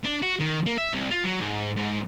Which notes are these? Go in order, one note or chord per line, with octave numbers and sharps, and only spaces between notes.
D4
F#4
D#3
A#3
E5
C2
F4
F#3
G#2
G#2